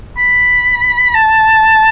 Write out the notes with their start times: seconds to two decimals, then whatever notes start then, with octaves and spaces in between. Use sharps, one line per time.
0.17 B5
1.15 A5